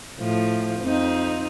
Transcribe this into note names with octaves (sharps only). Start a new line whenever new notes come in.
A2 F3
F2 C4 D#4